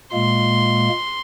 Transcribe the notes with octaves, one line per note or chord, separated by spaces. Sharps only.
A#2 G#3 A#3 C6